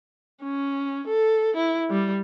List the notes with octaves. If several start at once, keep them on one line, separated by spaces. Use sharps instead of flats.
C#4
A4
E4
G3